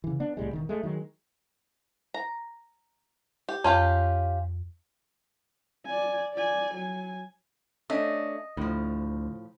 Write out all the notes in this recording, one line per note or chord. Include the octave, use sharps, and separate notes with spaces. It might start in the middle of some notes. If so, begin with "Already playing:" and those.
C#3 E3
B3 D4
C2 A2 G3 G#3
E1 D#3
G#3 A3
D#3 F#3 G#3
A#5
G4
F2 C#4 F4 G4
D5 G#5
D5 G#5
F#3 G#5
A3 C#4 D4 D#5
D2 A2 F3